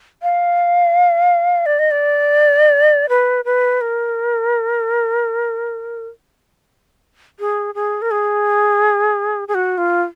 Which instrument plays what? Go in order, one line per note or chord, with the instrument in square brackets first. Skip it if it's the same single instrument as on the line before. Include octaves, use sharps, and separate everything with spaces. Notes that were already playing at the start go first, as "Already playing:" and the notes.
[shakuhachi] F5
D5
D#5
D5
B4
B4
A#4
G#4
G#4
A#4
G#4
G#4
F#4
F4